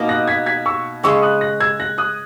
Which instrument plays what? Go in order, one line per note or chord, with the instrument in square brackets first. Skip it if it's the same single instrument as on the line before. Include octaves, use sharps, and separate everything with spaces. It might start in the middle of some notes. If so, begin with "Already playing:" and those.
Already playing: [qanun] B2 A#3 D#4 A#4
[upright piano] F#6 A#6
G#6 B6
G#6 B6
C#6 E6
[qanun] C#3 G#3 C#4 [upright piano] C#6 E6
[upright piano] D#6 F#6
F#6 A#6
E6 G#6
F#6 A#6
D#6 F#6